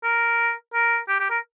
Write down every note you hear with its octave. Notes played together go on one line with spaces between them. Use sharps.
A#4
A#4
G4
G4
A#4